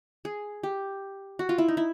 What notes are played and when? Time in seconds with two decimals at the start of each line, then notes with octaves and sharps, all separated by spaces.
0.25 G#4
0.63 G4
1.39 F#4
1.49 F4
1.58 E4
1.68 D#4
1.77 E4